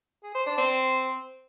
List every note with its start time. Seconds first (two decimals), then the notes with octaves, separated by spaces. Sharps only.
0.23 G#4
0.35 C5
0.46 D4
0.57 C4